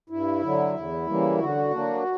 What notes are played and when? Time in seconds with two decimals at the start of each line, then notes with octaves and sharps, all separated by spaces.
0.10 G2 E4
0.43 D3 F#3
0.74 E2
1.07 C#3 E3 G3 A#3
1.39 D3 F#4
1.71 F#3 A#3 D4